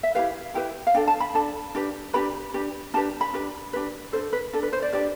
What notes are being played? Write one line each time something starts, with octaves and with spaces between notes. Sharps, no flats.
E5
E4 G4 B4 F5
E4 G4 B4 G5
F5
D4 A4 G5
A5
B5
D4 A4 A5
D4 G4 B4
D4 G4 B4 B5
D4 G4 B4
D4 G4 B4 A5
B5
D4 G4 B4
D4 G4 B4
D4 A4 C5
B4
D4 A4
B4
C5
D5
D4 G4 B4 D5